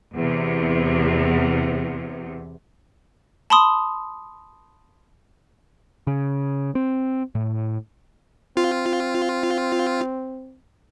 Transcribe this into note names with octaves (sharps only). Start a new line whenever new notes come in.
E2 C3
A5 B5 C6 D#6
C#3
C4
A2
C4 F4